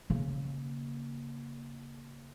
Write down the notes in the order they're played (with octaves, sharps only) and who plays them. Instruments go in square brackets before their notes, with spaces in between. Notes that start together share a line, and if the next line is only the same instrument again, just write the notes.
[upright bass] C#3 A#3